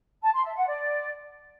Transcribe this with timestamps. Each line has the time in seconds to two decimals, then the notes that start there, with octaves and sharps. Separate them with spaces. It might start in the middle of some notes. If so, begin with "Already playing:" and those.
0.22 A5
0.33 C6
0.44 E5
0.55 F#5
0.67 D5